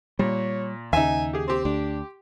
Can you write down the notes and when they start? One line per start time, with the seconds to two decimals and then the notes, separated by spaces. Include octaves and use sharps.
0.19 A#2 G3 C#5
0.93 D#2 C#3 D#4 E5 G#5
1.33 G4 G#4
1.48 C4 G4 C6
1.65 D2 D4